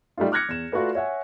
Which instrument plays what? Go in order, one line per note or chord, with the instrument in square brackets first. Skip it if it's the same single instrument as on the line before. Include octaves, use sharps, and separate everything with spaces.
[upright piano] G3 A3 D#4 F4
D6 F6 F#6 G#6 A#6 C#7
E2 E7
A3 F4 F#4 A4 B4 D5
C#5 E5 F#5 G#5